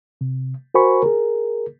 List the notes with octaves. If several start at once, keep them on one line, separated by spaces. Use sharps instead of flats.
C3
F#4 A#4 C5 G#5 B5 C#6
G#4 A#4